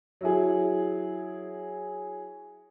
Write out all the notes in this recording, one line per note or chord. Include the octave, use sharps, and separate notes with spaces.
F#3 E4 G#4